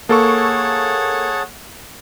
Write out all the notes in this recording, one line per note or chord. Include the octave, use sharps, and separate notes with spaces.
A#3 G#4 A4 C#5 F#5 A5 C#6